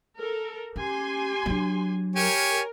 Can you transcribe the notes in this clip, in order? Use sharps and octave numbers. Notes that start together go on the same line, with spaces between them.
A4 A#4
C#4 G4 G#5 C6
F#3 D4
G4 A#4 C#5 G#5